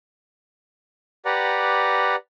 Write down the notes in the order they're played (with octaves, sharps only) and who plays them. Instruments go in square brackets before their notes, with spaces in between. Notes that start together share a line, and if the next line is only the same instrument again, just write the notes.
[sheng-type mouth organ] G4 B4 D5 F#5 A#5